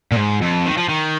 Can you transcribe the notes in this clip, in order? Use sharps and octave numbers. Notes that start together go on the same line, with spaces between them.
A#2
G#2
F2
D#3
F3
D#3